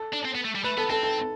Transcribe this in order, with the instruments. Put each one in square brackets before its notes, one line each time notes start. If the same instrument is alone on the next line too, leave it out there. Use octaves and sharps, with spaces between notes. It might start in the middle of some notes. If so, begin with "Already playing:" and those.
Already playing: [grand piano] A4
[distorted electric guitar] D4
C4
B3
A3
G3
[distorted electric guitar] A3 [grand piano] B4
[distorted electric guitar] B3 [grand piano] A4
[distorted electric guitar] C4 [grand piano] A4
[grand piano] A4